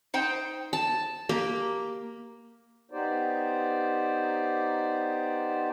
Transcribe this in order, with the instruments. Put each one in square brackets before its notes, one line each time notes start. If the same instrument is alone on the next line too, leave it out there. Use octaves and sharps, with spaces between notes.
[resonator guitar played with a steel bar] D#4 C5 G5
[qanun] A5
[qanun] A#3 [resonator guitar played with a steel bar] G4
[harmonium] B3 D#4 G4 C5 D5